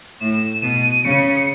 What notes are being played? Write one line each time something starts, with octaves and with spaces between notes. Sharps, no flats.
A2 E7
B2 D#7
C#3 C#7